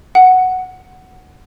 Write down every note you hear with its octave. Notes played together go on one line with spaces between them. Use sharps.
F#5